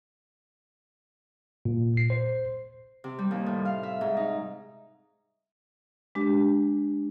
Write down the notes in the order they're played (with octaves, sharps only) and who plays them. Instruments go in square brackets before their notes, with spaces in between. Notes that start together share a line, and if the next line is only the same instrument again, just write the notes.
[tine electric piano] A#2
C7
C5
[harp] C3
G3
D#2
A2
F5
E5
G#2
D#4
[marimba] G#3 D4 G4